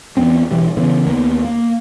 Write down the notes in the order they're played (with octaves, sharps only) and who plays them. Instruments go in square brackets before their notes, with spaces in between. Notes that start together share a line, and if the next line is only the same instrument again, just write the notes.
[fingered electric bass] E2 A#2 B3 C4
E1 E3 G3
C#3 E3 B3
D#2 A#3 B3
A#3